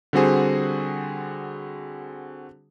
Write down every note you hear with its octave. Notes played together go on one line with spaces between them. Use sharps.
D3 G3 C4 F#4 G#4 C5